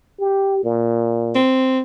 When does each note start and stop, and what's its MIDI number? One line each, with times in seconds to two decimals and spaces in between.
0.20 0.64 67
0.64 1.39 46
1.35 1.81 60